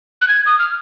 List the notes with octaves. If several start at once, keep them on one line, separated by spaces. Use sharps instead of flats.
F#6
G#6
D#6
F6